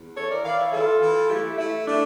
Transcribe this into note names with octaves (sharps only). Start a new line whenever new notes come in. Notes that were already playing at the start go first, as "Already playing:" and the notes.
Already playing: E2
E3 A4 C#5
A#4 D5
E3 D5 F5
C#5 E5
E3 F4 A4
E3
A3 E4 G4
A3 E4
A3 D4